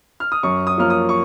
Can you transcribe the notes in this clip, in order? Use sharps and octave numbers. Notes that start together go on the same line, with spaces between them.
F6
D#6
F#2 C#6
D#6
F3 A#3 C#4 F6
D#6
C#6